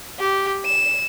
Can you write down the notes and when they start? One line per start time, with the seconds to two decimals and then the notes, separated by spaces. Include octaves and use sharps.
0.19 G4
0.65 E7